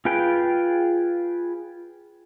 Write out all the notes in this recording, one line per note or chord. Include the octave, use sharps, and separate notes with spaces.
F4 G#4 B4 G5